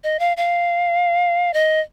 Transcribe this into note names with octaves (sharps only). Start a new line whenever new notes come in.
D#5
F5
F5
D#5